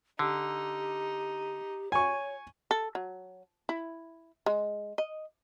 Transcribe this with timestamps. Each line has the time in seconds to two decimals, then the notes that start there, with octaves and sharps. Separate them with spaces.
0.19 D3 D#4 G4
1.92 C#5 G#5 C#6
2.71 A4
2.95 F#3
3.69 E4
4.46 G#3
4.98 D#5